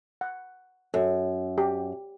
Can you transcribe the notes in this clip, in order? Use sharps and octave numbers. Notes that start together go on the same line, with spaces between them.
F#5
F#2 A4
G4